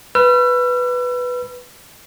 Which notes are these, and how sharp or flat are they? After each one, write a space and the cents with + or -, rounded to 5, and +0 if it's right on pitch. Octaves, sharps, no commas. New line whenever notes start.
B4 +0 E6 +40